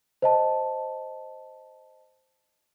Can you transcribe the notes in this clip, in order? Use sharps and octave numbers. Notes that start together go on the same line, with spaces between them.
C5 D#5 A5